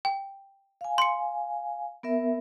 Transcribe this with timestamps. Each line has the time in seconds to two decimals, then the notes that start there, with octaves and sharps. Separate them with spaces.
0.05 G5
0.81 F5 G#5
0.98 C6 C#7
2.03 B3 A#4 E5